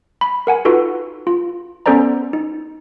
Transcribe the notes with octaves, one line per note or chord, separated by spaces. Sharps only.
B5
A#4 F#5 G#5
D#4 F4 F#4 A4 B4
F4
B3 C#4 A4 C5 D5 A#5
D#4